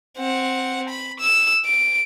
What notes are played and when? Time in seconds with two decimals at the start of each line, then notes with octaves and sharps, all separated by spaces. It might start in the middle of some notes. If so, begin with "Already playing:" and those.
0.18 C4 F#5
0.89 B5
1.20 E6
1.65 D7